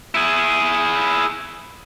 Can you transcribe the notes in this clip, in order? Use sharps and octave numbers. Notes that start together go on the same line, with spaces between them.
E4 G#4